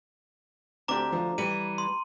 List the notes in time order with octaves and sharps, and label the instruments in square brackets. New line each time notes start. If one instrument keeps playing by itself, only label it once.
[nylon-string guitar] D2 D4 [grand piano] C4 G4 [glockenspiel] A#5 D6
[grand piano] F3
[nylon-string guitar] E3 G3 [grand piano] C#7 [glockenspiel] D#7
[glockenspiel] C6